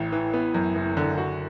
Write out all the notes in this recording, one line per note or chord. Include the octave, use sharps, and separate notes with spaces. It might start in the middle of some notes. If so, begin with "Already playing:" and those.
Already playing: A1 A2
E3
B3
F#2
F#1
D3
F#4